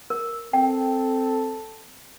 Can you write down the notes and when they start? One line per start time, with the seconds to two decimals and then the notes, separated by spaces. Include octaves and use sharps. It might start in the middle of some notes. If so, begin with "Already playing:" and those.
0.10 A#4
0.53 C4 A4 G5